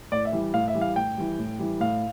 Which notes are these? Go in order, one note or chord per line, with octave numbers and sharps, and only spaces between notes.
A2 D5
E5
E3 G3
A2 F5
E5
E3 G3
F5
A2 G5
E3 G3
A2
E3 G3
A2 F5